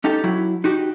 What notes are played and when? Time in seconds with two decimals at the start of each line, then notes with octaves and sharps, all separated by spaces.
0.04 C#4 D#4 G4 A4
0.24 F#3 E4
0.64 D#4 F#4 G4